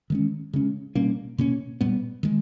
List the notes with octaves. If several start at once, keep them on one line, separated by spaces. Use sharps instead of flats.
D#3 G#3 C#4
C#3 G#3 C#4
B2 G3 A#3 C#4
B2 A#3 C#4
A#2 G3 B3
D#3 G#3